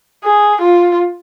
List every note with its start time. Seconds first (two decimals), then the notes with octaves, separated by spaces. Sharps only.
0.24 G#4
0.61 F4